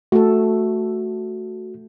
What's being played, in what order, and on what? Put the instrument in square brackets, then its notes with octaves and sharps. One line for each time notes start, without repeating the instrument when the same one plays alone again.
[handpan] A3 A4 [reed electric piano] F#4